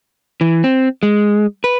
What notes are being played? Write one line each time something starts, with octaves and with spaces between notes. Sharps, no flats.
E3
C4
G#3
B4